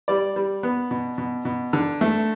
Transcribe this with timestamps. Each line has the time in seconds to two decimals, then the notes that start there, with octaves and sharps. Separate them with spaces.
0.08 G3 D5
0.36 G3
0.63 B3
0.91 B2
1.18 B2
1.45 B2
1.73 D3
2.01 A3